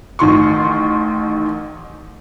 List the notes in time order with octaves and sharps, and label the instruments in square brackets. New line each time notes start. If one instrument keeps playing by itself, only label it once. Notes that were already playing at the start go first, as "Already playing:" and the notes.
[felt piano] A1 D#3 C6 C#6